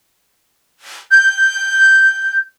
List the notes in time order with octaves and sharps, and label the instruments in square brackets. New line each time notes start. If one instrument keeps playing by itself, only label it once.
[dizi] G6